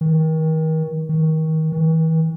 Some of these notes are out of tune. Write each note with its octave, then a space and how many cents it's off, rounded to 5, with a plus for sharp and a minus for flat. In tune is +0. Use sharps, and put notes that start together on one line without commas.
D#3 +35
D#3 +30
E3 -40